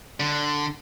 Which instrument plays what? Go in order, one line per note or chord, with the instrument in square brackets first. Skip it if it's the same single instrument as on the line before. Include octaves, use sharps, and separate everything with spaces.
[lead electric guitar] D3